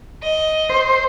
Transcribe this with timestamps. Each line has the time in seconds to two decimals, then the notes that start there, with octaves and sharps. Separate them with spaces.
0.23 D#5
0.70 C5